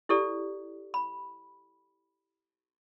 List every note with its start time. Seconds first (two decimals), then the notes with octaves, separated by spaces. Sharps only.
0.09 E4 G4 A4 D5
0.94 B5